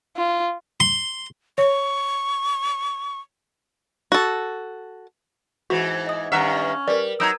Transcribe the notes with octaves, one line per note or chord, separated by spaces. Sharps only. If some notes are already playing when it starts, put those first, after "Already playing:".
F4
C6
C#5 C#6
F#4 A4
G#2 E3 F#4
D#5 D#6
G2 D#3 C#4 E5 F#5 A#5 F6 F#6
G3 A#4 B4 D5
F#3 D#4 A#5 D#6 E6 G6 G#6 D7